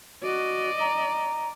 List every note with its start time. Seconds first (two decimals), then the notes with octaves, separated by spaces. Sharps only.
0.23 F#4 D5 D#5
0.80 A#5